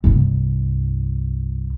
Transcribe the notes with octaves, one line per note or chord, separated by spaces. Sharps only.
C2 G2